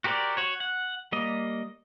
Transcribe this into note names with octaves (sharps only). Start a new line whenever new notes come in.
F#4 G4 A#4 C5 D5
F#4 C#5
F#5
G3 A#3 D#5